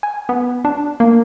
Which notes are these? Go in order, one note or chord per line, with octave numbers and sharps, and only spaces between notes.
G#5
B3
D4
A#3